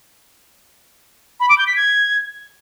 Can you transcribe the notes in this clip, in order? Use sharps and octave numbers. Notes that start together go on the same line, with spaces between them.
B5
D6
G6
B6
G#6